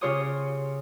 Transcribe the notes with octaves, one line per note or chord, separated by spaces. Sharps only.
C#3 F4 G4 C#5 C6 D#6